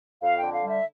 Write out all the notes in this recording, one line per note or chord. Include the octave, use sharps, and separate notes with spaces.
F2 F5
D3 G5
F5
G3
E5